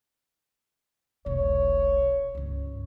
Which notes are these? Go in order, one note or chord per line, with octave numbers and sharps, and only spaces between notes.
E1 B1 C#5
C#2 G2